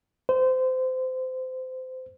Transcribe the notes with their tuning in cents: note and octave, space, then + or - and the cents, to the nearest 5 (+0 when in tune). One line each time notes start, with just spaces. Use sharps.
C5 -25